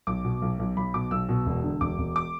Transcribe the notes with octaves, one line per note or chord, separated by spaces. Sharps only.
B1 D6
B2
B1
B1
B1 B5
B2 D6
B1 E6
B2
E1
D3
E1 D6
E1
D6